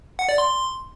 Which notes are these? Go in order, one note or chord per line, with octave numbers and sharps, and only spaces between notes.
F#5
D5
C6